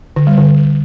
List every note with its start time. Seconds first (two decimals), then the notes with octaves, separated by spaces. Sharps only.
0.16 D3
0.27 G3
0.37 D3